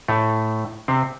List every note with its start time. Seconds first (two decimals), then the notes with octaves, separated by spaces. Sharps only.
0.08 A2 A3
0.88 C3 C4